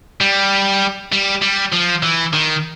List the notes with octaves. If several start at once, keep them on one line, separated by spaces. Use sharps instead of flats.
G3
G3
G3
F3
E3
D#3